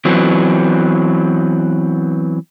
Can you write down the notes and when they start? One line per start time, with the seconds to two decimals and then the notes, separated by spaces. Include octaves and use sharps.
0.05 E3 F#3 B3 C4